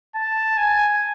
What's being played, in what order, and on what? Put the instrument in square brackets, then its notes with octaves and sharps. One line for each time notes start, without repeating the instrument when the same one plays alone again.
[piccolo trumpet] A5
G#5